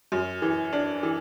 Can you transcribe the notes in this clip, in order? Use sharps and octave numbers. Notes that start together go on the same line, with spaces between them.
F#2
E3
D4
E3